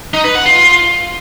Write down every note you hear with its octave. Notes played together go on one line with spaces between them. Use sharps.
D#4
B4
F#5
F4